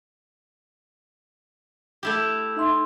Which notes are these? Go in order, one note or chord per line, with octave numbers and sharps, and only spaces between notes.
A3 E4 G4
D#4 E5 C6